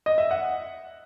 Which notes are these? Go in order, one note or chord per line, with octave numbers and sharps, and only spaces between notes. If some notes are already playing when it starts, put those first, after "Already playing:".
D#5
E5
F#5